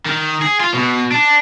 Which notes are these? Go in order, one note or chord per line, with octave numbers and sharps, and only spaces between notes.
D#3
G#4
F4
B2
D4